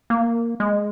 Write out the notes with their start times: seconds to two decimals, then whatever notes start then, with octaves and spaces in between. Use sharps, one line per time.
0.10 A#3
0.60 G#3